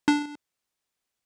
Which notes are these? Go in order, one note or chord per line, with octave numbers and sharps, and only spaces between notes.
D4